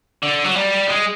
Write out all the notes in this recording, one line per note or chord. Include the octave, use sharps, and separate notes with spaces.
D3
F#3
G3
G#3